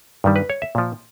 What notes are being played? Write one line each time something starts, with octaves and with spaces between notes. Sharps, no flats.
G2 D#3 G3
B4
C#5
E5
A#2 F3